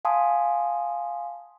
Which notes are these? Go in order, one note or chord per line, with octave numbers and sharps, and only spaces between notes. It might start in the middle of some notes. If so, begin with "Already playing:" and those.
F5 F#5 G#5 A5 C6 D#6